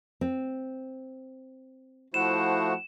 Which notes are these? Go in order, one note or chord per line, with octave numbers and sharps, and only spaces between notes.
C4
F3 A3 E4 F#4 C5 F#5 E7